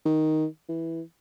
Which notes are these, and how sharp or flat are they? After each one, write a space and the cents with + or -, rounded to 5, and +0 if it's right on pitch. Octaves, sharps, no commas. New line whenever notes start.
D#3 +5
E3 -5